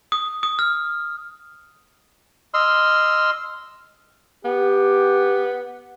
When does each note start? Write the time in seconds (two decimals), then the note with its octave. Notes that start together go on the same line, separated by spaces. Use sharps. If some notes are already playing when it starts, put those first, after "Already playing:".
0.12 D#6
0.43 D#6
0.59 F6
2.54 D#5 C6 E6 F6
4.45 B3 G4